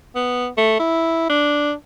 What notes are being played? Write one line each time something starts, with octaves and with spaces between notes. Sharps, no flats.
B3
A3
E4
D4